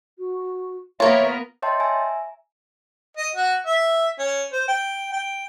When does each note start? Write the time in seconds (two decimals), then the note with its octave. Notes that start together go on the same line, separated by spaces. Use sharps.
0.19 F#4
1.00 A#3 B3 F4 A#4 C#5 E5
1.62 C#5 D#5 E5 G5 A5 C6
1.80 E5 G#5 A#5
3.17 D#5
3.35 F#4
3.66 E5
4.19 C#4
4.53 C5
4.68 G5
5.13 G5